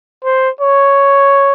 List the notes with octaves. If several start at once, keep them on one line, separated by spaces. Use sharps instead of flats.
C5
C#5